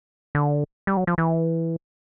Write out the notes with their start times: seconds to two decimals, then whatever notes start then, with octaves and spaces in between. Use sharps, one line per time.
0.35 D3
0.87 G3
0.97 F#3
1.07 F3
1.18 E3